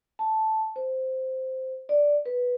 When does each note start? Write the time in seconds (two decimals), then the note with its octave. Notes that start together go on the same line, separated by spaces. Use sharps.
0.19 A5
0.76 C5
1.89 D5
2.25 B4